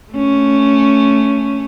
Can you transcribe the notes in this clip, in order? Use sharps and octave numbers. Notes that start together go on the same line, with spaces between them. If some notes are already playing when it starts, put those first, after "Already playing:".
A3 C#4